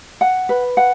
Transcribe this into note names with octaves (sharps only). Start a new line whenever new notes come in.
F#5
B4
F#5